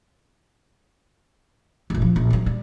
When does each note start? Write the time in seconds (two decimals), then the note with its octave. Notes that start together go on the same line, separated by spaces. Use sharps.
1.90 F1 A#1
2.02 F3
2.16 A#1
2.30 D#3 F#3
2.46 G3